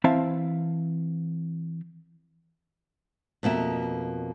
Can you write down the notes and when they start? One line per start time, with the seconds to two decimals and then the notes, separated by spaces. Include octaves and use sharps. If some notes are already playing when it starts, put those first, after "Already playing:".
0.04 E3 C4 E4 E5 F5 A5
3.43 F2 B2 A#3 E5